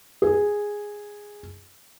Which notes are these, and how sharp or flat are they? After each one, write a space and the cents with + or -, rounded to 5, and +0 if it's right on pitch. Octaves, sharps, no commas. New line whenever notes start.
G#4 -5